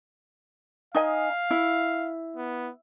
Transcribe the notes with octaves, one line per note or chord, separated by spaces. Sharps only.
D#4 D#5 F5 G#5
E4
B3